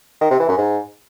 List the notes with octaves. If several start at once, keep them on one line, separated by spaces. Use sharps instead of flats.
D#3
C3
E3
F#2
G#2